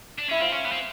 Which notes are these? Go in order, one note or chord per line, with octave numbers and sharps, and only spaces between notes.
D4
C#4 E4
C4 F4
C#4
B3
C4